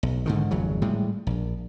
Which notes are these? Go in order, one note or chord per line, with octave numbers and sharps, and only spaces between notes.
B1
G#2 D3 D#3
G#1 F2 C#3 F#3
A2 G3 G#3
A#1